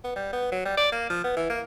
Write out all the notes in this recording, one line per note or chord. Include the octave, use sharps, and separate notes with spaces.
B3
G3
B3
F#3
G3
D5
A#3
F3
B3
E3
A#3